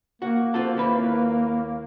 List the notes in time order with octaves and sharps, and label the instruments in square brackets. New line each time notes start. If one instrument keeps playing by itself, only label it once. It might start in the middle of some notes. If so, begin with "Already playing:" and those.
[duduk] A#3 [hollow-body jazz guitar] F#4
[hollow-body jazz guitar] C4 F4 A4
D#2 E4 B4